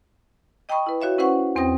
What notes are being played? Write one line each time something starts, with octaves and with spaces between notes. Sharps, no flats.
D#5 G5 A5 B5 C#6 D#6
E4 B4
F#4 C#5 E5 F5
C#4 E4 B4 C5 F#5 C#6
E2 C4 C5 G5 D#6 A#6